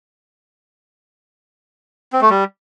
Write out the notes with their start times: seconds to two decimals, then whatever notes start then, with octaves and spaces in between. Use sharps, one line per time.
2.13 C4
2.21 A3
2.30 G3